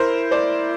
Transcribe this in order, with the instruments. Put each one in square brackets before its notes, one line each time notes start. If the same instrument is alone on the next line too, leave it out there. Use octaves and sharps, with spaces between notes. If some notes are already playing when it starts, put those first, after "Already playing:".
Already playing: [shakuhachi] E4 [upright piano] A#4 C5
[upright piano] C5 D5